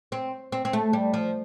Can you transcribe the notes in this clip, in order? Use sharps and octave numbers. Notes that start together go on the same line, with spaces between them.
C4
C4
C4
A3
G3
F3